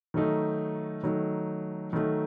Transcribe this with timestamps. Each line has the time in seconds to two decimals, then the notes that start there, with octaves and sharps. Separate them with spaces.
0.14 D#3 F#3 A3 D#4
1.03 D#3 F#3 A3 D#4
1.93 D#3 F#3 A3 D#4